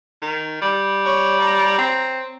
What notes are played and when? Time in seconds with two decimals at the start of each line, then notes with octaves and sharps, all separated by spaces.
0.22 D#3
0.61 G3
1.05 C#5
1.41 A#5
1.78 C4